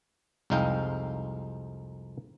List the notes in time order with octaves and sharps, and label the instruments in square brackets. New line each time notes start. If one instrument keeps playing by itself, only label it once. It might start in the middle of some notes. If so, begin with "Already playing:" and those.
[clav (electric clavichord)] C2 F2 G#3 D#4 F5 G5